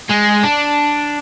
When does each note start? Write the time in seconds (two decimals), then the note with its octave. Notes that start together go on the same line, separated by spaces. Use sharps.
0.09 G#3
0.43 D4